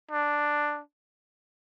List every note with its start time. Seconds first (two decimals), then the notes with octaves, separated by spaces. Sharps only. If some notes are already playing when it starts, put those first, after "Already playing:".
0.11 D4